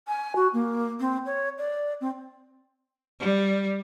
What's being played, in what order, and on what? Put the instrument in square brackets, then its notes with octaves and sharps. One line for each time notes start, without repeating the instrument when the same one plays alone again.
[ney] G#5
F#4
A#3
C4
C#5
D5
C4
[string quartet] G3